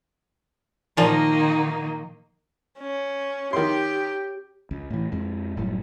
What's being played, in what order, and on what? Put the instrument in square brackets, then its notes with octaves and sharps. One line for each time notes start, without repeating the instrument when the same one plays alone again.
[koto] A#2 F3 [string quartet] D#3 A#3 D#4
[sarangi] C#4
[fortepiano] D#3 C6 [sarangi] G4
[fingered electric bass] C#2
A2 E3
F2 G#3
F#1 A2 F#3 G3